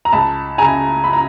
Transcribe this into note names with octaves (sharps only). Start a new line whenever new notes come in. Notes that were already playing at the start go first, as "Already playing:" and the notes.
A#5
C#2 A5 B5
C#3 G#5 A#5
B5
A#5